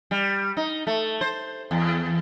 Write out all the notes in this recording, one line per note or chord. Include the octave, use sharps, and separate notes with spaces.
G3
D#4
A3
C5
E2